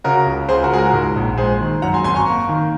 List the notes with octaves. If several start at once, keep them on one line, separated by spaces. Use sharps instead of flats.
C#3 F#4 A#4
C#2
C#2 G#4 C5
F#4 A#4
G#3 G#4
F#4 A#4
G#2
A#1
G#3 G#4 C5
D#3
F#2 F#5 A#5
G#5 C6
G#1 G#5 C6
A#5 C#6
A#3
D#3